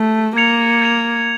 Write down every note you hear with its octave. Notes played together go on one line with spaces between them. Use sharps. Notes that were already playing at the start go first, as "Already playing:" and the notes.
Already playing: A3
A#3 G#6 C#7 F7
G#6 C#7 F7